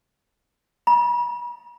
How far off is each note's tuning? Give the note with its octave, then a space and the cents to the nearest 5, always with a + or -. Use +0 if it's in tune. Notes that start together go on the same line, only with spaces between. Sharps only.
B5 -40